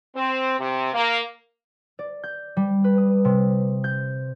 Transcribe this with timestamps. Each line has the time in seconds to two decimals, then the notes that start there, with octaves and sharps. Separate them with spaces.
0.15 C4
0.59 C3
0.94 A#3
1.99 D5
2.24 G6
2.57 G3
2.84 B4
2.98 D#6
3.25 C3
3.84 G6